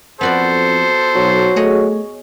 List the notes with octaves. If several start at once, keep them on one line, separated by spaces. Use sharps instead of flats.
F2 B3 F#4 A4 C5 D5
B1 F#3
A3 G#4 C#5 D#5